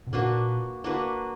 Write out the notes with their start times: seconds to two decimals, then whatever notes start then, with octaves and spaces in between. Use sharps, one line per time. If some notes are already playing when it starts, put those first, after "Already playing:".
0.07 B2
0.13 A#2 A#3 D4 F#4 B4
0.84 A#3 D4 F#4 B4